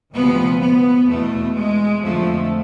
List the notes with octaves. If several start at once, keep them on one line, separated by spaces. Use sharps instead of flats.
D2 C3 F3 B3
B3
E2 B2 A3
G#3
F2 D3 F3 A3